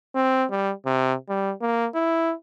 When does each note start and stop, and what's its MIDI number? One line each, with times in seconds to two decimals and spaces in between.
0.15 0.45 60
0.50 0.72 55
0.86 1.14 48
1.29 1.53 55
1.62 1.87 58
1.95 2.33 64